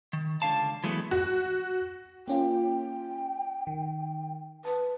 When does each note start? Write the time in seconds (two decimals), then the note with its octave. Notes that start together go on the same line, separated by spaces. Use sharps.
0.13 D#3
0.42 C#2 D3 F5 A5
0.84 E3 F#3 G#3 A3 B3
1.11 F#4
2.28 A#3 C#4 F4 G5
3.67 D#3
4.65 B4 A5